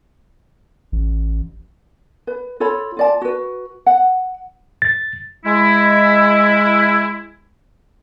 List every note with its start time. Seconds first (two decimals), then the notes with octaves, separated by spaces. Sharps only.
0.92 A1
2.27 B4
2.60 F4 A4 C#5 B5
2.97 F4 D5 A5
3.22 F#4 B4
3.86 F#5
4.82 A6
5.45 G#3 E4